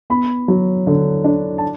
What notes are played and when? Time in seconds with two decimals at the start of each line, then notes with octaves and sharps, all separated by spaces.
0.10 B3 B5
0.48 F#3
0.87 D3
1.24 D4
1.58 A5